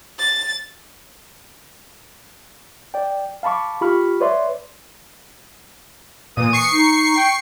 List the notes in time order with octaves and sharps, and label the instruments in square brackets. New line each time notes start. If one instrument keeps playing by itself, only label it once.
[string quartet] A6
[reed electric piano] D5 G5
F5 A5 B5 C#6 D6
F4 G4 B5 C#6 F6
B4 C#5 D5 E5 C6
[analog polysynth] A#2 [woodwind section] E3 D#6
[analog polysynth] C#6 C7 C#7
[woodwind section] D#4
G5